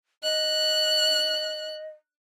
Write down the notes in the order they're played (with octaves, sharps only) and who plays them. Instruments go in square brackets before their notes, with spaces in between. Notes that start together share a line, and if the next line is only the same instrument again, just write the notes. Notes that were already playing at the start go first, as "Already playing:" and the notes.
[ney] D#5 [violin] F#6